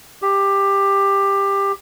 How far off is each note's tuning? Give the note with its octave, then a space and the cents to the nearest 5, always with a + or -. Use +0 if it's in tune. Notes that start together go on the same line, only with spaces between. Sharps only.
G4 +15